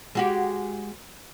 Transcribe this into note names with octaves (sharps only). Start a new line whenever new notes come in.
G#3 F#4 G4